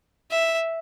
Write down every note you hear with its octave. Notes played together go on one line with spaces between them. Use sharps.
E5